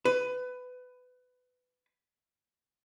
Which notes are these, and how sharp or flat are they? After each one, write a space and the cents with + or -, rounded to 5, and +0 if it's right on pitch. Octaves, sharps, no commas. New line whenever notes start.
B4 +20